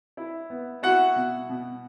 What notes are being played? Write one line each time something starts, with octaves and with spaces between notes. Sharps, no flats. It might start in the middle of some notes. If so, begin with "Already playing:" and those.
E4
B3
E4 F#4 F#5
B2
B2